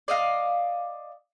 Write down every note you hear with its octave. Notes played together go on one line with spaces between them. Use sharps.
D5 D#5 F5